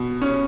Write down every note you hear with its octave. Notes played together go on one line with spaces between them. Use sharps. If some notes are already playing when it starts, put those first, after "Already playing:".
Already playing: B2
C#4